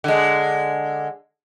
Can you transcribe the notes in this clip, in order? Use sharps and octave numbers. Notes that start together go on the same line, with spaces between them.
D3 G#3